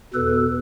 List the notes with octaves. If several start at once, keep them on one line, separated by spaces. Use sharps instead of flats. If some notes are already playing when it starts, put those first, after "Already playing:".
E2 B2 A4 B4